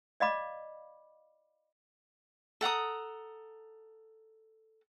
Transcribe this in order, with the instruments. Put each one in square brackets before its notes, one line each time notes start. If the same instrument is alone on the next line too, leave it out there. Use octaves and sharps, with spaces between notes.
[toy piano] D5 D#5 F5 B5 D6
[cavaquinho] A4 F#5 A#5 D#6